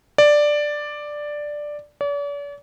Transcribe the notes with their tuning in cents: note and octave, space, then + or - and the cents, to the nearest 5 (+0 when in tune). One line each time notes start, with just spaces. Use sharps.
D5 +5
D5 -45